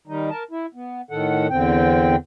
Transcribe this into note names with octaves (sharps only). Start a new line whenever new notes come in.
D#3 G3 D#4
A#4 A5
E4
B3
A2 D#3 A4 F#5
E2 D3 C4 G5